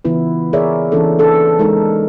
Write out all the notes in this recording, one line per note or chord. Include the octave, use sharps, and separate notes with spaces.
C#3 E3 B3 E4 F4 B4
G#4 A#4 C#5 D5 E5
E3 A#3 C#4 D4 E4 A4
D4 A4
G#3 D#4 A#4